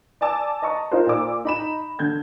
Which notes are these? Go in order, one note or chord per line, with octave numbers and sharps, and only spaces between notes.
D5 G#5 A5 D6 E6
D#5 A5 A#5 C#6
D#4 F4 A#4 C5
A#2 D5 D6 E6
D#4 B5 E7
D3 G6 G#6